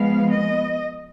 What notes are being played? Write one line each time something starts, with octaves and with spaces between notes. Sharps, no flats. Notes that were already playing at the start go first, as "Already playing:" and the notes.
Already playing: F3 G#3 B3 F5
D#5